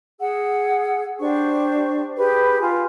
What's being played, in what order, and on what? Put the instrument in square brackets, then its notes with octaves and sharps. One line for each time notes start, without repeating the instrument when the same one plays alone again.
[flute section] G#4 F#5 E6
D4 G4 C5 C#6
G4 G#4 B4
F4 G#5